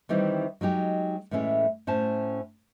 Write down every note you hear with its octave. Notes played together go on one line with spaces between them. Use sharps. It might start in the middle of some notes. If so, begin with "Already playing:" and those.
D#3 E3 G3 C4 D#4
F#3 G#3 D#4 G4
A2 E3 G#3 A3 C#4
A2 C#4 C5 A5